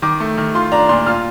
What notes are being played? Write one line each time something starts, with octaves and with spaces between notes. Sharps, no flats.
D#3 D6
A3
D#3
F4 C6
D4 A#5
A#2 C6
F4 F6